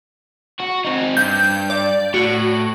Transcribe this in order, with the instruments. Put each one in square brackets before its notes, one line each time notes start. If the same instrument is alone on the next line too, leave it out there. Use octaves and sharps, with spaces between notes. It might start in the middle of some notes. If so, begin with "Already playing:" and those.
[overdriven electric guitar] F#4
C4 D#4
[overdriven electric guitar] G2 [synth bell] G6
[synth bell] D5
[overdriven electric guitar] A2 [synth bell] F#4